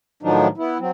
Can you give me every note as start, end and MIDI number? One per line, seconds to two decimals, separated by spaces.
0.23 0.47 45
0.23 0.47 51
0.23 0.47 53
0.23 0.47 54
0.23 0.47 62
0.23 0.47 63
0.58 0.78 59
0.58 0.78 64
0.79 0.91 54
0.79 0.91 60